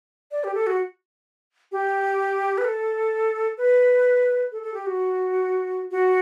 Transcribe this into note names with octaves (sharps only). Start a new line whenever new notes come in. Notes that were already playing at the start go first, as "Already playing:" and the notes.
D5
G4
A4
F#4
G4
B4
A4
B4
A4
A4
G4
F#4
F#4